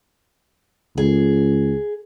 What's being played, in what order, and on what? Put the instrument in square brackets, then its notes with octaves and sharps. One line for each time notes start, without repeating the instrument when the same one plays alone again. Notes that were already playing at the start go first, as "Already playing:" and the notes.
[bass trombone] C#2 [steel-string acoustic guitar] G#4